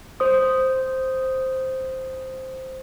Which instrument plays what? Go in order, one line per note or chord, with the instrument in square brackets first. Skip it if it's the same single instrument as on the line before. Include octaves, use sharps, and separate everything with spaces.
[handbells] C5 D#6